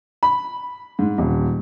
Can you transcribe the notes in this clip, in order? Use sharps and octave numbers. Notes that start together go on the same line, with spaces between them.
B5
G#2
D#1